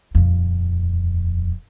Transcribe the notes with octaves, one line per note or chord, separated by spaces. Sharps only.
D#1 F2